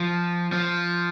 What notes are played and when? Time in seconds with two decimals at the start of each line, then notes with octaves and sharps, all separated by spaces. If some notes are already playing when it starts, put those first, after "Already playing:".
Already playing: F3
0.53 F3